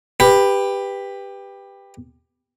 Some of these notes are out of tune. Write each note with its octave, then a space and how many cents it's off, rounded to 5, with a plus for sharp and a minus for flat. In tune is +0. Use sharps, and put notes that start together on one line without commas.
G4 +15 B4 +0